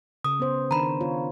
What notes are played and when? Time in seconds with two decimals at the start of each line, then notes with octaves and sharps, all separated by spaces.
0.24 C#3 D#6
0.40 B3 C5
0.71 D#3 D4 A#5 B5
1.01 B3 F4 C#5